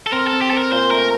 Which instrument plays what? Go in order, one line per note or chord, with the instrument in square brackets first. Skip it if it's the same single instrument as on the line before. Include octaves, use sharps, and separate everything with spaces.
[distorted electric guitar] A4
[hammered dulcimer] C4 [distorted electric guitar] A#4
[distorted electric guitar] A4
[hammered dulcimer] C4
[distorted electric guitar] G4
[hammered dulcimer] C4 [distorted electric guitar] A4
[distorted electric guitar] A#4
[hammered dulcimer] A#2 [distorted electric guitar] C5
[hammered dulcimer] A3 [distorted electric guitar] A#4